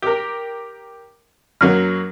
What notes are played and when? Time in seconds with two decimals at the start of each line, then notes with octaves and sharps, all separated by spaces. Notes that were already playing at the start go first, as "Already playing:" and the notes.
0.02 G4 A#4
1.61 F#2 F#3 A#3 F6